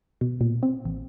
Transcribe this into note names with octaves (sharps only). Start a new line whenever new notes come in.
B2
A#2
C4
A1